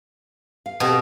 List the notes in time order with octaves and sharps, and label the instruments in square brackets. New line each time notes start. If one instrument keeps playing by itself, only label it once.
[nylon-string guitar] F5
[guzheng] B2 [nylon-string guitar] C4 G4 A4